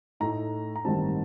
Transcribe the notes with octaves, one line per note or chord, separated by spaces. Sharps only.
A2 A3 D#4 A#5
A#5
A1 G2 D#3 G3 C4 A5